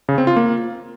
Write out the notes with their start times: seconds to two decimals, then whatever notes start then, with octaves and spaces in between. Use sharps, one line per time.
0.09 C#3
0.18 C4
0.27 F4
0.36 A#3